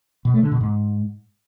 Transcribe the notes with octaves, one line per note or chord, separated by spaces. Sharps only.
B2
A3
D3
B2
G#2